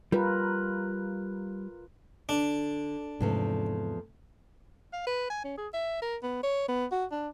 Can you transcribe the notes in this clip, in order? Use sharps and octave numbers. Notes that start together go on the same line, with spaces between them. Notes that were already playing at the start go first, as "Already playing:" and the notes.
G3 F4 A#4 B4
D3 D4
E2 G#2 C3 F3 A3
F5
B4
G#5
C#4
G#4
E5
A#4
B3
C#5
B3
F#4
D4